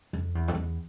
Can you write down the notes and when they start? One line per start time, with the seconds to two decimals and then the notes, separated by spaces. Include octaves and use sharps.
0.13 F2
0.35 E2
0.48 F2
0.55 E2